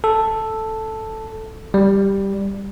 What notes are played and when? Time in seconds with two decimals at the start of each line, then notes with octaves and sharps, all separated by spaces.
0.04 A4
1.74 G3